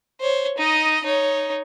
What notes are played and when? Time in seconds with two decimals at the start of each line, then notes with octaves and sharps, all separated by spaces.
0.22 C5 C#5
0.58 D#4 D#5
1.04 D#4 C#5